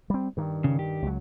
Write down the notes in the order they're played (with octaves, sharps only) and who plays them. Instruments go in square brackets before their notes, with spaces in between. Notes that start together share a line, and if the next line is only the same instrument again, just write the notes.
[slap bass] G3 C4
G2 D#3
[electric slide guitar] C#3
G4
[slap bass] C#2 F#3